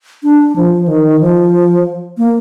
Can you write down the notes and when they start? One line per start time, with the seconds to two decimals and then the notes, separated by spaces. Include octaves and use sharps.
0.23 D4
0.56 F3
0.88 D#3
1.20 F3
2.18 A#3